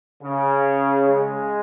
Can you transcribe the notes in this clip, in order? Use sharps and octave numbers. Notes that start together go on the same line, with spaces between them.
C#3
G#3